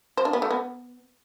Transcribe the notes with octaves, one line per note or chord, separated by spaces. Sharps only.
C5
D4
B3
A3
B3